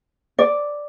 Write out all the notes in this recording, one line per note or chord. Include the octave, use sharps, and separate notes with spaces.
D5